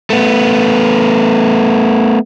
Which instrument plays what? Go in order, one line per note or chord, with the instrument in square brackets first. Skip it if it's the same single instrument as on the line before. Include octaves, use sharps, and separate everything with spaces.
[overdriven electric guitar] A3 B3